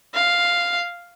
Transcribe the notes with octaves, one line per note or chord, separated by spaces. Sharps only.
F5